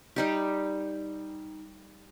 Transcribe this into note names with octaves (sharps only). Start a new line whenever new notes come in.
G3 D#4 G4